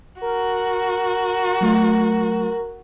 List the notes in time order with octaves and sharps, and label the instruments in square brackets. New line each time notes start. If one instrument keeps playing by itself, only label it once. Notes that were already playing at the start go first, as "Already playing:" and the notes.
[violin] F#4 [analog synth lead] A#4
[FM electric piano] F#3 A3